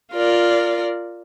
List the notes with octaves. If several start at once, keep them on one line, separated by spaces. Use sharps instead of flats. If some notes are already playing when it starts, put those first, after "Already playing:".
F4 A#4 D5